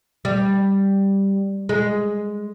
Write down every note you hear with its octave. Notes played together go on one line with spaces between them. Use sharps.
G3
G#3